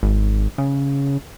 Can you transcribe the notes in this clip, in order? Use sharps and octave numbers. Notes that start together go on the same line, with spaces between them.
G#1
C#3